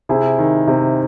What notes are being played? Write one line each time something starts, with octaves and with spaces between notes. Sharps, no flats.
C3 E4 G#4
D#3
C3